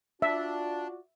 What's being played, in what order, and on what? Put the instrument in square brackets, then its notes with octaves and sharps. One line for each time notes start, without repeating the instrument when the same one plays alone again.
[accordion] D4 [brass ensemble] F4 F#4 D5 [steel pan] E5